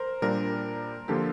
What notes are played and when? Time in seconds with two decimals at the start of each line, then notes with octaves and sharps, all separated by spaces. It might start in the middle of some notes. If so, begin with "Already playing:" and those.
Already playing: A#4 C5
0.22 A#2 G3 D4 A#4
1.08 D3 F3 A#3 F4 G4 A4